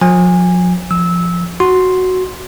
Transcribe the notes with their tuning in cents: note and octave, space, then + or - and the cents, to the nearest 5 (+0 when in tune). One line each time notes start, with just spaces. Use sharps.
F3 +45 G#5 -20
F3 +0 E6 -20
F#4 +0 C6 +0